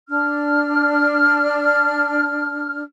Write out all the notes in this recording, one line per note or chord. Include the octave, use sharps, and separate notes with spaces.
D4 F6